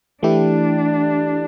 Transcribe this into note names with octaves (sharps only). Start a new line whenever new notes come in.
E3 A3 D4 E4 G4